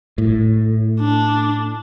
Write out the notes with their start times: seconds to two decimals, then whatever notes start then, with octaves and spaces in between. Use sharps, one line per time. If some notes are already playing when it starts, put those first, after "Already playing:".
0.18 A2
1.00 D4